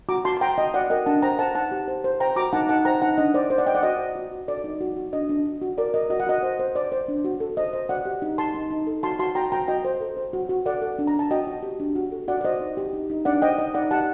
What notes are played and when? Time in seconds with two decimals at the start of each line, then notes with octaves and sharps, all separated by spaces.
0.09 F#4 A#5 D6
0.25 F#4 A5 C6
0.37 C6
0.41 F#4 G5 A#5
0.58 F#4 D#5 G5
0.74 F#4 D5 F#5
0.90 A#4 D#5 G5
1.06 D4 F#5 A5
1.22 C5 G5 A#5
1.39 C5 F#5 A5
1.55 D#4 F#5 A5
1.72 G4
1.88 C5
2.04 C5
2.20 C5 G5 A#5
2.36 F#4 A#5 D6
2.53 D#4 F#5 A5
2.69 D#4 F#5 A5
2.85 C5 G5 A#5
3.02 D#4 F#5 A5
3.18 D4 D#5
3.34 C5 D5
3.50 C5
3.58 D5 F#5
3.66 C5 D#5 G5
3.75 D5 F#5
3.83 F#4 D#5
3.99 C5
4.15 F#4
4.31 F#4
4.48 A4 D5
4.64 D#4
4.81 F#4
4.96 F#4
5.13 D4 D#5
5.29 D4
5.45 F#4
5.62 F#4
5.78 A#4 D5
5.94 A#4 D#5
6.10 F#4 D#5
6.20 F#5
6.27 F#4 D#5
6.43 C5
6.59 C5
6.75 C5 D5
6.92 C5
7.08 D4
7.24 F#4
7.40 A4
7.57 C5 D#5
7.73 C5 D#5
7.89 F#4 D5 F#5
8.05 G4
8.22 D#4
8.38 D#4 A5 C6
8.55 D#4
8.71 D#4
8.87 A4
9.03 F#4 A5 C6
9.19 F#4 A5 C6
9.35 F#4 G5 A#5
9.52 F#4 G5 A#5
9.68 F#4 D#5 G5
9.85 C5
10.01 A4
10.17 C5
10.33 F#4
10.49 F#4
10.66 A4 D5 F#5
10.82 A4
10.99 D4
11.07 A#5
11.14 D4
11.19 A5
11.31 F#4 D#5 G5
11.47 F#4
11.63 G4
11.80 D4
11.96 F#4
12.12 A4
12.28 F#4 D5 F#5
12.41 D5
12.45 C5 D#5
12.60 D#4
12.77 G4
12.93 D#4
13.10 D#4
13.25 D4 D5 F#5
13.42 C5 D#5 G5
13.58 D#4 D#5
13.74 D#4 D5 F#5
13.91 G4 F#5 A5